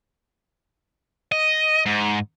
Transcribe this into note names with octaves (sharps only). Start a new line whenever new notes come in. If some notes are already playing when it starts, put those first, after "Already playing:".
D#5
G#2